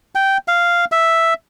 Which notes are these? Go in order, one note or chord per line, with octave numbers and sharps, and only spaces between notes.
G5
F5
E5